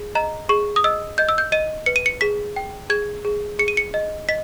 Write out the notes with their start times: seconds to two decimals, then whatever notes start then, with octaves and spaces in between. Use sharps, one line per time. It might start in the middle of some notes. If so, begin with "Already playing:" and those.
Already playing: G#4
0.15 D#5 A#5
0.49 G#4 C#6
0.76 D#6
0.84 D#5 E6
1.18 D#5 G6
1.29 E6
1.38 G6
1.52 D#5 D#7
1.86 B4 C#7
1.96 D#7
2.06 C#7
2.21 G#4 B6
2.56 G5
2.90 G#4 G#6
3.25 G#4
3.59 G#4 C#7
3.68 D#7
3.77 C#7
3.94 D#5
4.29 D#5 B6